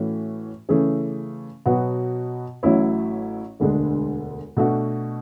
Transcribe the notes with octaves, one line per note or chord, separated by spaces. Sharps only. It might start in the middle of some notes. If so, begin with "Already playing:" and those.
Already playing: A2 E3 A3 C#4 F#4
C#3 E3 A3 C#4 G#4
B2 F#3 B3 F#4
A1 A2 F#3 C#4 E4
E1 D2 D3 G#3 D4
B2 A3 D4 F#4